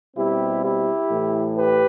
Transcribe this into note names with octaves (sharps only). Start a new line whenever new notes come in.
B2 G3 C4 E4 G4
E4 G4
A2 E3 A3
G4 B4